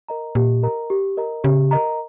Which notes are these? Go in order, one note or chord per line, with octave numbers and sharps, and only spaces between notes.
A#4 D#5 A#5
A#2 G4
A#4 D#5 A#5
G4
A#4 D#5 A#5
C#3 G4
A#4 D#5 A#5